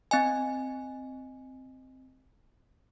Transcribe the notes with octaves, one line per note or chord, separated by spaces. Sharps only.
C4 D#5 G#5